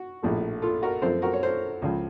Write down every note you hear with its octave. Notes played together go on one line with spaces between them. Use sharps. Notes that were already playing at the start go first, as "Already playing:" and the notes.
Already playing: F#4
A#1 A2 F3 A3
F4 A4
F#4 A#4
F#2 F3 A3 C4 A4 C5
F#4 A#4
C#5
A4 C5
C#2 C#3 F3